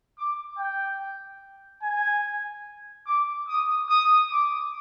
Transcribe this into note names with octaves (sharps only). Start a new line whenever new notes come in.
D6
G5
G#5
D6
D#6
D#6
D6